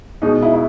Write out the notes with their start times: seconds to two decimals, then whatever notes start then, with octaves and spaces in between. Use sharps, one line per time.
0.22 B2 G#3 D#4
0.43 E4
0.53 E4